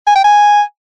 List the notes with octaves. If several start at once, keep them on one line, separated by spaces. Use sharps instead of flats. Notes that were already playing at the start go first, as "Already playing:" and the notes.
G#5
G5
G#5